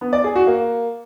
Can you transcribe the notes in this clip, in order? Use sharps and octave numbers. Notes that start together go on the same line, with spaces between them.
B3
D5
G#4
F#4
A#3